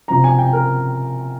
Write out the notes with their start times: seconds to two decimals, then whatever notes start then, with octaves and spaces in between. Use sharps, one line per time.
0.08 C3 F3 C4 A#5
0.24 G#5
0.38 G5
0.53 A#4